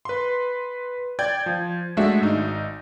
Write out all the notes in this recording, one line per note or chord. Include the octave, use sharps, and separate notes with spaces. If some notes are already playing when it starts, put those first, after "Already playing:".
B4 C6
D5 G5 G6 G#6
F3
G#3 A3 D4 F#4 E5
G#1 D#4